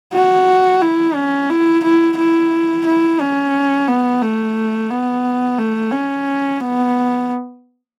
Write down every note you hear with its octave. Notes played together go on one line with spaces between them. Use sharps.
F#4
E4
C#4
E4
E4
E4
E4
C#4
B3
A3
B3
A3
C#4
B3